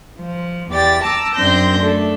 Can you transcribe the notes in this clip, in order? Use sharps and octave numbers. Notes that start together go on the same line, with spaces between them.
F3
E2 G4 D5 A6
A5 A#5 D6 E6
F#2 C4 D4 C6 G6 A#6
A3 D4 A4